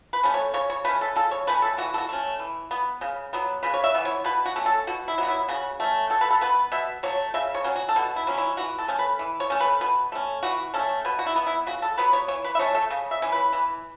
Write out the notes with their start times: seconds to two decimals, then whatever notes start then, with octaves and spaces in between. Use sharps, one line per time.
0.13 B4
0.23 A3 C#4
0.34 C#5
0.54 C#3 C#5
0.70 C#5
0.85 A3 B4
0.89 C#4
1.01 A4
1.16 C#3 A4
1.31 C#5
1.47 A3 C#4 B4
1.62 A4
1.78 E3 F#4
1.94 A4
1.98 F#4
2.09 A3 C#4
2.39 E3
2.71 B3
3.01 C#3
3.33 F#3 B3
3.63 C#3 B4
3.74 C#5
3.84 E5
3.94 E3 B3
4.05 C#5
4.24 B2 B4
4.46 F#4
4.56 A3 C#4
4.66 A4
4.87 B2 F#4
5.08 E4
5.18 F#3 B3 F#4
5.28 E4
5.49 C#3 F#4
5.80 A3 C#4
6.10 B2 A4
6.21 B4
6.30 A4
6.41 B3 B4
6.72 B2 E5
7.03 F#3 A3 C#5
7.34 C#3 E5
7.55 C#5
7.64 F#3 C#4
7.76 F#4
7.89 A4
7.96 B2 F#4
8.16 E4
8.27 F#3 C#4
8.38 E4
8.57 E3 F#4
8.78 A4
8.88 A3 C#4
8.99 B4
9.19 E3
9.40 C#5
9.50 A3 C#4
9.60 B4
9.81 B2 B4
10.12 A3 C#4
10.43 E3 F#4
10.74 C#4 A4
10.79 A3
11.05 B2 B4
11.19 F#4
11.26 E4
11.36 B3
11.47 E4
11.66 C#3 F#4
11.82 A4
11.98 F#3 B3 B4
12.13 C#5
12.28 E3 C#5
12.44 B4
12.55 E5
12.59 A3 C#4 C#5
12.75 A4
12.90 C#3
13.11 E5
13.22 E3 C#4
13.32 B4
13.53 E3